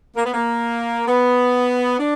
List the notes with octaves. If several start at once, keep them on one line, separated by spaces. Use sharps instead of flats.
A#3
B3
A#3
B3
D4